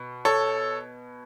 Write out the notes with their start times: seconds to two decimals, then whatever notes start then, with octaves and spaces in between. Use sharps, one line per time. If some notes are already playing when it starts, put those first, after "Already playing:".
Already playing: B2
0.25 A4 C#5